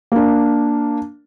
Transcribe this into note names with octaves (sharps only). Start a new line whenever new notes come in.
A#3 D4